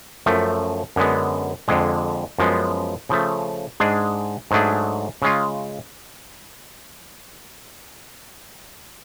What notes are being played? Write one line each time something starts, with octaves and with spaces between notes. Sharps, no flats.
F#2 F3 A3
F#2 D3 G#3 B3
F2 D3 G#3
F#2 F3 G#3 B3
C#3 F3 A3
G#2 G#3 D4 G#4
G#2 F#3 A3 D4 G#4
C#3 G#3 C#4 F4